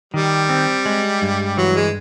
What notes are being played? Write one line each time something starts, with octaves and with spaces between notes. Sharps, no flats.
D#3 G3
C4
G#3
G2
E3 F#3
G#3